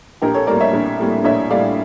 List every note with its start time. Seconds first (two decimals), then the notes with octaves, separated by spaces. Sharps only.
0.22 A#1 G4 A#4
0.34 A4 C#5
0.47 A2 G3 A#3 A#4 D5
0.61 C#5 E5
0.73 A#1
0.99 A2 G3 A#3
1.24 A#1 C#5 E5
1.51 A2 G3 A#3 D5 F5